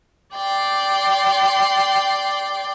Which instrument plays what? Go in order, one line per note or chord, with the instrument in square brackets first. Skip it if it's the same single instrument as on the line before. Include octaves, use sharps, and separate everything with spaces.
[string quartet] D5 G5 C6